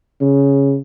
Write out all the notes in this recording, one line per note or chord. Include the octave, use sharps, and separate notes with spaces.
C#3